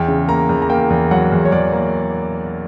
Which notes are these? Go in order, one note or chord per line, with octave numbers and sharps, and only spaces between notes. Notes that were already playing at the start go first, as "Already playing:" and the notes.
Already playing: E2 G5
C#3
A#3 A#5
E2
A#5
A#3 G5
E2
F#3 F#5
E2
C#5
E2 D5
A#3